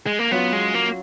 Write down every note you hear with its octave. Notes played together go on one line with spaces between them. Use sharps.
G#3
A#3
F#3 B3 C#4 F4
G#3
A#3